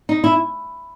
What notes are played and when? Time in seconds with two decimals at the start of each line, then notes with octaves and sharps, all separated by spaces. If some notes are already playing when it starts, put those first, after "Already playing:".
0.09 D#4
0.24 E4